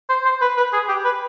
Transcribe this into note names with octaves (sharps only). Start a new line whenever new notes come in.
C5
C5
B4
B4
G#4
G4
B4